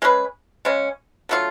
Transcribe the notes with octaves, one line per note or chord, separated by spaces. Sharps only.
G#3 C#4 G#4 B4
C#3 G#3 C#4
D3 F#3 A3 F4